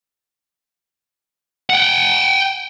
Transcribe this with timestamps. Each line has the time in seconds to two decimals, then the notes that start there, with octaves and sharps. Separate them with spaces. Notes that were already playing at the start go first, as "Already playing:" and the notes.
1.70 F#5 G5